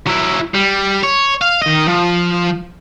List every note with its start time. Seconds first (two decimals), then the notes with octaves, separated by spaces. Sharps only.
0.07 F#3 E4
0.54 G3
1.04 C#5
1.42 F5
1.62 D#3 D#5
1.88 F3